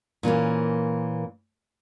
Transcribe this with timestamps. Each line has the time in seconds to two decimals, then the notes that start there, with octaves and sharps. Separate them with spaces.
0.23 A#2 E3 A#3 C#4